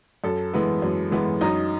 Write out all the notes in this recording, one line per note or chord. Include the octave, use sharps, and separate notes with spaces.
F#2 A4
E3 G#3 B3
F#2
E3 G#3 B3
F#2 D#4